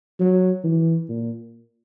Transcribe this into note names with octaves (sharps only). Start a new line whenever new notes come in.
F#3
E3
A#2